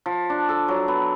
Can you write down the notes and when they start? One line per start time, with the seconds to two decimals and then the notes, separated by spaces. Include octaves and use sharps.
0.06 F3
0.30 D4
0.49 A4
0.68 F#3
0.88 B3